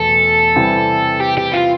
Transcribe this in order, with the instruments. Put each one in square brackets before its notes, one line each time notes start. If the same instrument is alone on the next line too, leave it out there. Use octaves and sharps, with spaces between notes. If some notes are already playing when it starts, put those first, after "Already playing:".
Already playing: [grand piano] E2 B2 A3 [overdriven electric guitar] A4
[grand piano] C3 E3 G3 C4
[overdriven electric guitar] G4
G4
F4